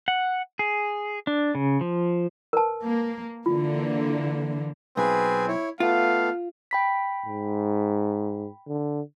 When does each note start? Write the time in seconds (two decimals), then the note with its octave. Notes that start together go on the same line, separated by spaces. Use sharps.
0.08 F#5
0.59 G#4
1.27 D4
1.55 C#3
1.81 F3
2.53 A#4 B4 A5
2.86 A#3
3.46 D3 E3 A#3 F4
4.97 B1 C4 G#4 B4 G#5
5.48 E4 C#5
5.80 A3 B3 F4 F5
6.71 G5 B5 B6
7.26 G#2
8.68 D3